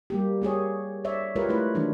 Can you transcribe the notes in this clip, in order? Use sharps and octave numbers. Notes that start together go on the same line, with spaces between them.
G3 A#3 G4
A#3 G4 G#4 C#5
C#5 D5 E5
G#3 F4 G4 A#4 B4 C#5
A3 E4 B4
D#3 E3 F#3 G#3 D4